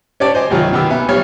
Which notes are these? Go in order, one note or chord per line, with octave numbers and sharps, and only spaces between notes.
C#4 G4 C#5 D5 A5
C5 D#5 G#5
C2 D#3 F#3 F4
B2 D#3 B3 G4 E6
B3 E5 G#5
B1 B2 G3 C#5 F6